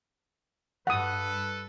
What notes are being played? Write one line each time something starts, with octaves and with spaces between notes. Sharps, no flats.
G2 A4 B4 F#5 D#6